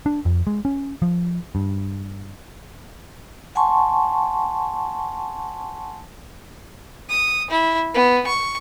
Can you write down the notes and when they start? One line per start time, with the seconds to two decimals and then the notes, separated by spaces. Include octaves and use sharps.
0.06 D4
0.25 F2
0.47 G#3
0.65 C#4
1.02 F3
1.55 G2
3.55 F#5 G#5 A5 C6 C#6
7.09 D#6
7.51 E4
7.94 B3
8.27 C#6